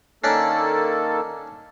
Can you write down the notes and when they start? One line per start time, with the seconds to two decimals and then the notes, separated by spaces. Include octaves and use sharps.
0.24 D#3 A#3 C#4 D4 A4 D5